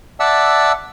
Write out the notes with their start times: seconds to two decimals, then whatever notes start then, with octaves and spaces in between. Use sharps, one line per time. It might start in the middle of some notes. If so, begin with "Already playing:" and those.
0.20 D5 E5 F#5 A5 E6